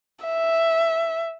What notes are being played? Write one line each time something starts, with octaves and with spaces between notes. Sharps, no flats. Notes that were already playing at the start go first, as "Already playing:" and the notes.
E5